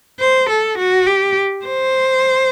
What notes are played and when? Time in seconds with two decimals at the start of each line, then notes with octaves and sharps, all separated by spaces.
0.20 C5
0.50 A4
0.78 F#4
1.07 G4
1.65 C5